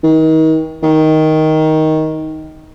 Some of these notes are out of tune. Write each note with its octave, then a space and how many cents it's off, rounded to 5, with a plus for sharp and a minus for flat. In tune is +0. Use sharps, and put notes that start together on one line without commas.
D#3 +35
D#3 +10